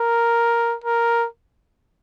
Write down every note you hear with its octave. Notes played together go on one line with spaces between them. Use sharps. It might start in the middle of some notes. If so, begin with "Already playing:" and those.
Already playing: A#4
A#4